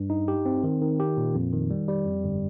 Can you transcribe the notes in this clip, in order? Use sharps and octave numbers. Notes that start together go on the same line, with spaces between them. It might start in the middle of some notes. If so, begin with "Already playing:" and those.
Already playing: G2
D#4
G4
C4
D#3
D#3
G4
A#2
F2
D#3
G3
G3
F2
G1